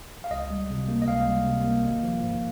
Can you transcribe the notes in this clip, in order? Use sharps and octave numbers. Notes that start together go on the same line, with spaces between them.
F5
C#2 D#5
G3
C3
A#3
D#5
C#2 F5
G3
C3
A#3
G#1
F3
G#2